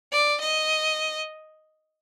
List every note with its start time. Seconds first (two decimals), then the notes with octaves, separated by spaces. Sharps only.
0.12 D5
0.40 D#5